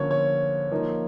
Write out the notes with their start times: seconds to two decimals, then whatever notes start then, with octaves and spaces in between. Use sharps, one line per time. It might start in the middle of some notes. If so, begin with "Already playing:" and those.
Already playing: D3 F3 A#3 C#4 C#5
0.11 C#5
0.72 F3 A#3 D#4